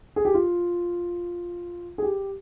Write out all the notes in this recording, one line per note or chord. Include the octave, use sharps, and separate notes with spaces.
G#4
G4
F4
G#4
G4